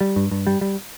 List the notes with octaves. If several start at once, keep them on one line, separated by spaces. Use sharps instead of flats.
G3
G2
G2
G3
G3